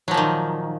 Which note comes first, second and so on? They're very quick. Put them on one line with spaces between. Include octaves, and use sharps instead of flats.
F#3 F3 A#2 D#3